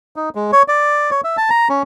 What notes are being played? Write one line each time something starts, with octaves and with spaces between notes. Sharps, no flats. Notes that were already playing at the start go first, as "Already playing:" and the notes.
D#4
G#3
C#5
D5
C#5
E5
A5
A#5
C#4